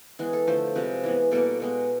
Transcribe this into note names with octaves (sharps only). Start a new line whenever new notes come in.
E3 G#3 B3 G#4
A4
D3 F3 A3 C5
C3 F3 G#3 B4
E3 G#3 B3
B2 G3 A#3 A4
B2 G#3 B3